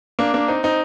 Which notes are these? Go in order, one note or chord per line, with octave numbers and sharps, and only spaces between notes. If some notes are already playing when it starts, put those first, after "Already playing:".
A#3 D4
A#3 D4
C4 D#4
C4 D#4